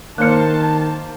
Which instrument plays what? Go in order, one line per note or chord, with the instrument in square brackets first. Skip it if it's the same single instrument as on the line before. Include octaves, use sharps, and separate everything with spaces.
[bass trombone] D#3 [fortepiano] A#3 C5 F6 [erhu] A5 [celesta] F#6 C#7